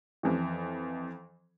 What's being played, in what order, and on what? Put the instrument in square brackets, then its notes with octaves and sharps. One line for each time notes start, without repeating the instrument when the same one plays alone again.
[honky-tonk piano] F2 E3